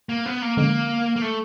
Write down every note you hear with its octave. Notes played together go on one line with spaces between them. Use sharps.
A#3
B3
A#3
D3 F3 G#3 A#3 C#4
A#3
A3